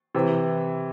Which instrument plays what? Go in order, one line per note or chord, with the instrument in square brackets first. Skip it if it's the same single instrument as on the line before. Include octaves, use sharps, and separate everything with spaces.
[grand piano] C3 E3